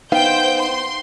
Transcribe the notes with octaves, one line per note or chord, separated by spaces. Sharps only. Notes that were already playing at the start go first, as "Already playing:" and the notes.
B3 D#4 C5 F5 G5 G6
C6